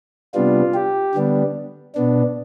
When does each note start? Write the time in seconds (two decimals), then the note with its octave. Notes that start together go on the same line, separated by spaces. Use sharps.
0.34 C3 G3 B3 D4 F4
0.74 G4
1.14 D3 G3 B3 D4
1.95 B2 B3 D4